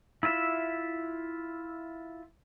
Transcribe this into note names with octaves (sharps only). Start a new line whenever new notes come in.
E4 F4 B4 E5